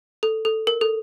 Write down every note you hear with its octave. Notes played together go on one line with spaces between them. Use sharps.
A4
A4
A#4
A4